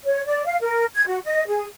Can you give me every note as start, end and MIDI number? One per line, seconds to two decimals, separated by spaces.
0.04 0.25 73
0.26 0.43 74
0.46 0.56 77
0.61 0.85 70
0.94 1.03 92
1.07 1.19 66
1.24 1.46 75
1.47 1.66 68